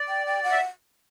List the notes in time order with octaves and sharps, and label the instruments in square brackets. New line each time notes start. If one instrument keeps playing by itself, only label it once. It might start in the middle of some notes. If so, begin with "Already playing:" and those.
Already playing: [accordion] D5
[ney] G5
G5
F#5
[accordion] E5